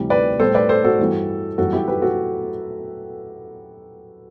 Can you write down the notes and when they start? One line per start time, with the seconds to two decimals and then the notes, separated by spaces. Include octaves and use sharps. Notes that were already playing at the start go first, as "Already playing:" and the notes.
Already playing: D2 C3 E3 G3
0.10 B4 D5
0.39 A2 G3 A4 C5
0.55 B4 D5
0.69 A4 C5
0.84 F#4 A4
0.99 G2 E3 G3
1.58 F#2 E3 G3 F#4 A4
1.73 E4 G4
1.88 G4 B4
2.02 F#4 A4